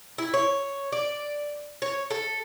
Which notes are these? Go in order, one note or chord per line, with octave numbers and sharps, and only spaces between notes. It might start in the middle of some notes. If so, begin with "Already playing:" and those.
E4
C#5
D5
C#5
A4